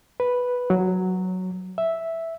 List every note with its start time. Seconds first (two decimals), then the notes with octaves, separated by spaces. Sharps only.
0.20 B4
0.70 F#3
1.78 E5